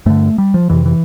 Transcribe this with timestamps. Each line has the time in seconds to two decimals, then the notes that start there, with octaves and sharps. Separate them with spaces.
0.06 G2 D3 A3
0.38 G3
0.54 F3
0.70 F2 C3 E3
0.86 E3